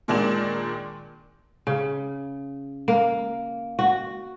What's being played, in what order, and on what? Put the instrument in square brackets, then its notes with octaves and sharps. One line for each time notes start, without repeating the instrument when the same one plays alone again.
[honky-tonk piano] A#2 D#3 G#3 D4 D5 E7
[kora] C#3
A#3
F#4